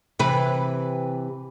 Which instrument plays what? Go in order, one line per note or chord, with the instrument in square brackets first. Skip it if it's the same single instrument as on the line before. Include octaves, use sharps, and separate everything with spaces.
[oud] C3 E3 B4